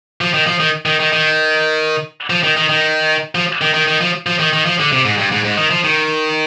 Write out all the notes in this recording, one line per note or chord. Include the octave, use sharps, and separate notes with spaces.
F3
D#3
F3
D#3
D#3
D#3
D#3
F3
D#3
D#3
D#3
F3
D#3
D#3
D#3
F3
F3
D#3
D#3
F3
D3
C3
G#2
G2
G#2
G#2
D#3
F3
D#3